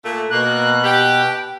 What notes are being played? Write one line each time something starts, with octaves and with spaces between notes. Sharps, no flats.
A#2 A3
B2 A#3 F#6
G4